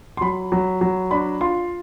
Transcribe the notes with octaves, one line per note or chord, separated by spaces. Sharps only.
C6
F#3 B5
F#3
F#3
D4 B5
F4 C6